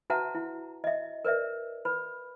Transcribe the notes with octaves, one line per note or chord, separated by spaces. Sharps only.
F#4 B4 E5 F#5 A5 A#5
E4
D#5 E5
A#4 B4 D5 E5
B4 B5